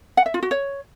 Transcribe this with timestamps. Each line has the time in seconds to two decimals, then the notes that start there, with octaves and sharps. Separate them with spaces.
0.17 F#5
0.26 E5
0.34 F4
0.43 F#4
0.51 C#5